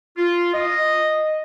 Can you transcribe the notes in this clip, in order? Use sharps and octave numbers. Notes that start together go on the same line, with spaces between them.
F4
D#5